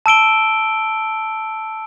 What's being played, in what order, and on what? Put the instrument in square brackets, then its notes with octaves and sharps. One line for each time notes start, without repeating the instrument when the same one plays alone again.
[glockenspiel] A5 E6 D7 G7